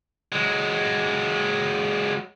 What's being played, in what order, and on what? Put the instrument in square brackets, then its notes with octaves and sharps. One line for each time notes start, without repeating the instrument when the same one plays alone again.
[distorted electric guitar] F#3 G#3